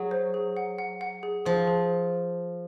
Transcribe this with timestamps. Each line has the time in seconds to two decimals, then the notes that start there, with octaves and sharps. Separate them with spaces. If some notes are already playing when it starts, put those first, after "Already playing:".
Already playing: F#3 G#4
0.11 C5
0.34 G#4
0.57 F#5
0.78 F#5
1.01 F#5
1.23 G#4
1.46 F3 G#4
1.67 G#4